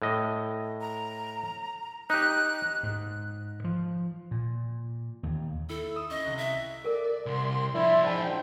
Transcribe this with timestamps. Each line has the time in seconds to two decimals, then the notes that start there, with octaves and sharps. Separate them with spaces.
0.02 A2 D#5
0.81 A#5
2.10 D#4 G4 F#6
2.83 G#2
3.64 F3
4.31 A#2
5.23 D#2
5.69 E4 A4
5.96 D#6 E6
6.10 C#4 D#5
6.25 C2 F#6
6.38 E5
6.84 A4 A#4 D5
7.26 C2 C6
7.75 F3 D4 E4 D5 C6
8.04 G#2 D5 G5 A5 B5